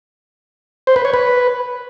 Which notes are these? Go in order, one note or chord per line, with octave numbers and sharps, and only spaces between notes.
C5
B4
C#5
B4